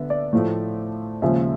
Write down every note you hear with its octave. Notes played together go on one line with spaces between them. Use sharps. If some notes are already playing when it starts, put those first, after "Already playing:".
Already playing: D3 B3 E5
D5
A2 F3 A3
D#2 C#3 F3 G#3 E5